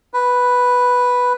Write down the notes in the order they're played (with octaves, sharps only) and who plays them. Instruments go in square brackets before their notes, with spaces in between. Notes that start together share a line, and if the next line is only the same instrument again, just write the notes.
[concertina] B4